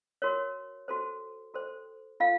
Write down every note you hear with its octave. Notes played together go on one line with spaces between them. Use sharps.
F#4 A#4 C#5
F#4 A4 C5
F#4 A4 C5
F4 A4 F5